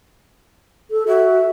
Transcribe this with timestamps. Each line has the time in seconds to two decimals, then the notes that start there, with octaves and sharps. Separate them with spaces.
0.91 A4
1.08 F#4 E5